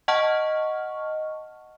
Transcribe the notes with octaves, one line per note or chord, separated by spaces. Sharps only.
D#5 F#5 A5 C#6 F6